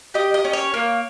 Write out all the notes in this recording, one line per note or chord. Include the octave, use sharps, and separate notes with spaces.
G4 D#5
D#5
C#4
C#5
A#3